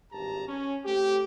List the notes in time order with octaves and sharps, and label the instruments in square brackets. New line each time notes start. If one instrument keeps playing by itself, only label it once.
[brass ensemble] G#1 G2 G4 A5 A#5
C#4
A3 C4 G4